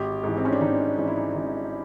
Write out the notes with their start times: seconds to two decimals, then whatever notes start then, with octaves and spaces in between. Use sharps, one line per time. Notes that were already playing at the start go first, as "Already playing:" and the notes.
Already playing: G#1 G4
0.24 G#2 E3
0.37 C4
0.45 C#4
0.52 D4
0.61 G#1 D#4
0.98 G#2 E3 D#4
1.07 E4
1.16 D#4
1.35 G#1